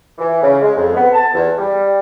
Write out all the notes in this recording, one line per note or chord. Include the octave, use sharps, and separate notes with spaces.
E3
C#3
G#3
F2
B3
A5
E2
G3